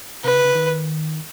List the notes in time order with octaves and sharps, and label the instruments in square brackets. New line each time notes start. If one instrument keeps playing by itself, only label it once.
[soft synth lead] C3 [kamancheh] B4
[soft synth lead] C#3
C#3
D#3